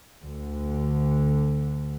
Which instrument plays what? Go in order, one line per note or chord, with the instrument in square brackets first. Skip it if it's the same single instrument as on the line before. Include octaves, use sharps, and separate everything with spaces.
[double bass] D2 D3